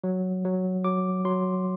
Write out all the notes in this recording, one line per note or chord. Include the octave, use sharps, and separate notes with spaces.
F#3
F#3
F#3 D6
F#3 C6